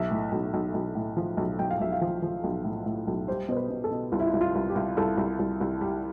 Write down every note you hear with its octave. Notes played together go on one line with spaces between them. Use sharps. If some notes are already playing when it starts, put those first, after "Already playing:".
Already playing: B1 E5
A2
B1
B1
B1
A2
F3
B1
B1 G5
F5
B1 E5
F5
F3
F3
B1
A2
A2
B1
G3 C5
B2 C5
B4
B2
A4
B2
C2 F4
E4
F4
C2
F4
C2
G4
C2
C2 A4
C2
C2
C2
G3